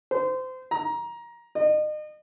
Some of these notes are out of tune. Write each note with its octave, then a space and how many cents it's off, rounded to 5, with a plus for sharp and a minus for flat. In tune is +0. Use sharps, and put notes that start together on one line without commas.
C5 -25
A#5 +20
D#5 -35